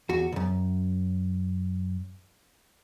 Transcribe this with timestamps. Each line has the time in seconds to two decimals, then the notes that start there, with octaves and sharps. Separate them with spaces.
0.09 E2 F#4
0.33 C2 F#2